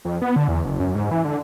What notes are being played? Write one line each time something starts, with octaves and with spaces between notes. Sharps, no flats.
F2
B3
D3
E2
F#1
F#2
G#2
E3
D3